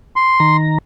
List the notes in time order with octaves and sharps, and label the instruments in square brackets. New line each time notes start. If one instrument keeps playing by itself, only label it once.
[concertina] C6
[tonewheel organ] D#3 A#5